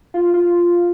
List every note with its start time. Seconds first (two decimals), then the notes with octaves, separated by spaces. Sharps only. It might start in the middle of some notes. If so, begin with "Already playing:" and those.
0.14 F4
0.34 F4